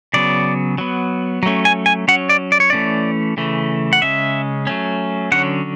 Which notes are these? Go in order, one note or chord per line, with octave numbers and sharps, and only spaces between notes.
C#3 F#3 B3 D5
F#3 B3
F#3 A3 C#4
G#5
G#5
F#3 C#4 F#5
D5
D5
C#5
E3 A3 C#4 D5
C#3 E3 A3
F#5
C#3 G#3 C#4 E5
F#3 A3 C#4
D3 F#3 C#4 F#5